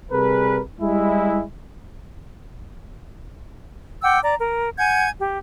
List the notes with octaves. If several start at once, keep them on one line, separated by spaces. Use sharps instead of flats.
C3 G3 G#4 A#4 B4
G3 G#3 E4
F#5 G5 D6 E6
D5 A#5
A#4
F#5 G#5 G6 G#6
G4